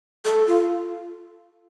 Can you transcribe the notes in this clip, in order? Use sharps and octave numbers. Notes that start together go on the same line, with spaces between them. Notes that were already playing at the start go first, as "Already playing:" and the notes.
A4
F4